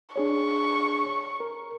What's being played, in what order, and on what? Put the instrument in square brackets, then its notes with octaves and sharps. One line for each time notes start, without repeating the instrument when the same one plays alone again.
[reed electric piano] D4 G#4 C#5 [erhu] C#6
[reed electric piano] A#4